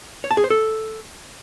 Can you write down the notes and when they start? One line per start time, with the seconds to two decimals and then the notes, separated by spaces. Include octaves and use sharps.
0.24 C#5
0.31 A5
0.37 G#4
0.44 C5
0.50 A4